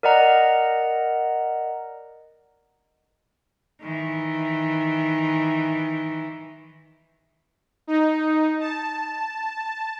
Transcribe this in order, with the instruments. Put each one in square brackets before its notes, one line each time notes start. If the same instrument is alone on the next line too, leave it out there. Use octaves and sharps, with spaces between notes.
[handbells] A#4 D5 D#5 F#5 A#5
[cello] D#3 E3
[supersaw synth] D#4
A5